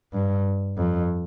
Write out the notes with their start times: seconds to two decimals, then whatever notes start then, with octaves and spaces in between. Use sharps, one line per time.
0.13 G2
0.77 F2